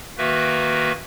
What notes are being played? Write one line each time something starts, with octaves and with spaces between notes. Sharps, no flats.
D#3 A#3 F#4 B4 E5